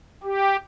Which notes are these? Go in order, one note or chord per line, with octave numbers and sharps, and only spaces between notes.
G4